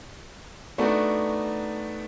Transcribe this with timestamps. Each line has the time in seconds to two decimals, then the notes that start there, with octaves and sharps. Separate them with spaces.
0.78 A3 B3 D4 D#4 F#4 A4